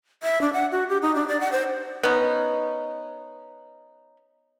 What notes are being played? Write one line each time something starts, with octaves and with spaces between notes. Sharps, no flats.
E5
D4
F#5
F#4
G4
D#4
D4
D5
F#5
C5
B3 C#4 D#4